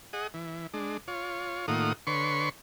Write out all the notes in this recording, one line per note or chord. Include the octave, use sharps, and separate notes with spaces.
G#4 D#5 F#5
E3
G#3 D4
F4 C#5
A2 D#3 A#3 F4 F#5 D#6
D3 B4 C#5 C6 C#6